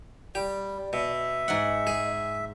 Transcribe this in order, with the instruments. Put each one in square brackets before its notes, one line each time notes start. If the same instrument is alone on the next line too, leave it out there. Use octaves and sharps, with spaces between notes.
[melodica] G3 [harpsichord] G4 [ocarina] D5
[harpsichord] B2 [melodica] E5
[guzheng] G#2 F#5 [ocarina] D#5
[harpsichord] G#4